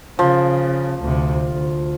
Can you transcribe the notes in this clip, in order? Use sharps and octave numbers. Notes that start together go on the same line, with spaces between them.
C#3 F3
D2 C3
D2